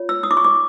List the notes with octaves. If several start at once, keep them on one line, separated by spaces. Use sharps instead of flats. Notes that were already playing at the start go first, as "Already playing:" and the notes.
Already playing: F4 C#5
E6
D#6
D6
C#6
D6